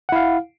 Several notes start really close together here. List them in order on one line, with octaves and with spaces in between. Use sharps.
F#5 E4 F5